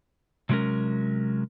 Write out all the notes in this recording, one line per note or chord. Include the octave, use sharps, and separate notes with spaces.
C3 F#3 G#3 C#4 A#4